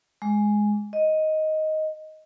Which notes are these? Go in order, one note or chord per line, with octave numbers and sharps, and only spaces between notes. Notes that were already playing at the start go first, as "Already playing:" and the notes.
G#3
D#5